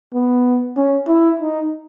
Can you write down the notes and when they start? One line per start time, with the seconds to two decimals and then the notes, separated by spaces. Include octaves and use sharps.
0.13 B3
0.77 C#4
1.07 E4
1.40 D#4